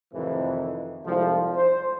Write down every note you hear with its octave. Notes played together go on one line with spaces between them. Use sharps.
F2 A2 C3 D#3 E3
C2 F2 G#2 F3
C5